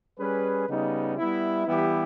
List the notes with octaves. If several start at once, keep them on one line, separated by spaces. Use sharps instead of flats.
G3 C#4 G#4 B4
C#3 G3 B3 D#4
G3 B3 E4
E3 G3 B3 E4 G4